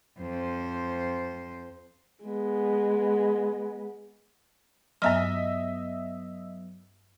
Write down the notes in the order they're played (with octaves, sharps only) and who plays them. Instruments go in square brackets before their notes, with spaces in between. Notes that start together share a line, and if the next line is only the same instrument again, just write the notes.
[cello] F2 C5
[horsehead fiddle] G#3 B3
[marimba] G2 A#5 F6 [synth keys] F#3 B3 [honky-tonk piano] D#5 E5